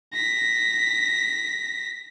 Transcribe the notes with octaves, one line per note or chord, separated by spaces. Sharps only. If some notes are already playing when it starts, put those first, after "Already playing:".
A#6 B6